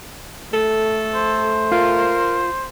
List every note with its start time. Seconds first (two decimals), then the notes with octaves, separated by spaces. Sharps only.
0.53 A3 A4
1.15 C5
1.72 F4 A#4